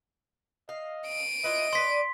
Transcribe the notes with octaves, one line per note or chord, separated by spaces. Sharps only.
D#5 F5
D7 D#7
E4 F4 B4 D#5
B4 C#5 D5 C6 B6